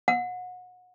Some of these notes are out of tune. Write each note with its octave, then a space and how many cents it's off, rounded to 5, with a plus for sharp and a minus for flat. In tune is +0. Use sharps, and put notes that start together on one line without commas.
F#5 -30